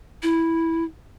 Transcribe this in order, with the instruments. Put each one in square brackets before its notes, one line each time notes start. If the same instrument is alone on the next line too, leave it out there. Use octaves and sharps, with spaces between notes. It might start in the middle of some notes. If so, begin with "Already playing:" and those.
[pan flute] E4